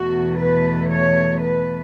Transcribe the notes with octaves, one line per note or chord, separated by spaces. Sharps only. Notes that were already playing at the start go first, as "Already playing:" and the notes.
Already playing: E2 B2 A3 F#4
B4
C#5
B4